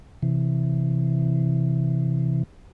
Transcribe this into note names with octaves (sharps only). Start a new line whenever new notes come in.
C3 E3